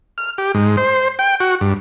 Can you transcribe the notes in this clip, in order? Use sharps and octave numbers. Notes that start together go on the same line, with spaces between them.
F6
G4
G#2
C5
G5
F#4
G2